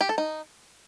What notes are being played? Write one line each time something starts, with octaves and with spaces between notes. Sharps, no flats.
G4
A4
D#4